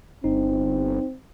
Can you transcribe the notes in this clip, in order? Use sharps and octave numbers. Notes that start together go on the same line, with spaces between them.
G1 C4 D#4